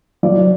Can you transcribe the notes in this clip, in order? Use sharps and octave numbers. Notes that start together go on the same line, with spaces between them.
F#3 D5